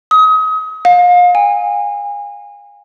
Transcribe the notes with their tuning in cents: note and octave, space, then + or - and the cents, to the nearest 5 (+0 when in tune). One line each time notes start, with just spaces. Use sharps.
D#6 +30
F5 +35
G#5 -30